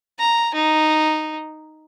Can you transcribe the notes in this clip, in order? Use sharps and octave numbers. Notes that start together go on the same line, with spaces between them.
A#5
D#4